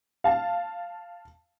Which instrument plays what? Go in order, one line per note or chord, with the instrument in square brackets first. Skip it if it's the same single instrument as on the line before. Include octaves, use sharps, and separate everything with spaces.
[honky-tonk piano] F5 A5